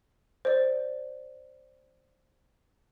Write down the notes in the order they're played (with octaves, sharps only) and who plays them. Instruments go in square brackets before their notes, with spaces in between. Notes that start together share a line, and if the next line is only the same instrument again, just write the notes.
[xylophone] C5 D5